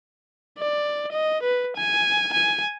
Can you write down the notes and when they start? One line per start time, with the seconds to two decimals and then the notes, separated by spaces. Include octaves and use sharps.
0.58 D5
1.12 D#5
1.43 B4
1.77 G#5
2.33 G#5